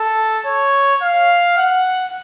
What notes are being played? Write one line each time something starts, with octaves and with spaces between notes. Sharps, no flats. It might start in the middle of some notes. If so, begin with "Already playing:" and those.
Already playing: A4
C#5
F5
F#5